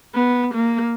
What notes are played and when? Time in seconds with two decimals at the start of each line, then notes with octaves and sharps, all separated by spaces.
0.15 B3
0.54 A#3